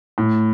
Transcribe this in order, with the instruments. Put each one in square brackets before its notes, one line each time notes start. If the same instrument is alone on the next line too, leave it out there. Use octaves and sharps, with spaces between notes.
[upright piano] A2